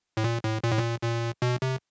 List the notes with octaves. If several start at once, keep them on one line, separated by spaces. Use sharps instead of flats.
A2
A#2
A2
A#2
A2
A#2
A#2
B2
C3